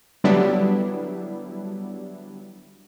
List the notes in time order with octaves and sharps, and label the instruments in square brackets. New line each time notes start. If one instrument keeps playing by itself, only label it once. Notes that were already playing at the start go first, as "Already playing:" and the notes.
[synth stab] D3 F#3 G3 B3 D4 E4